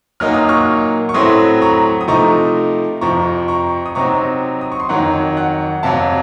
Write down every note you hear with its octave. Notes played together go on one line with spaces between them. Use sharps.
A#2 F#3 A#3 D#4 F6
D#6
C#6 F6
C#6
A2 F#3 A3 C4 C6 D#6
A#5 C#6
D#6
C3 F3 A3 D#4 A#5 C#6
F2 C3 F3 A#5 C#6
A#5 C#6
D#6
C3 F#3 C4 D#4 A#5 C#6
D#6
C#6
C6
F2 D#3 F#3 F#5 A#5
F#5
F2 C3 F#3 F5 A5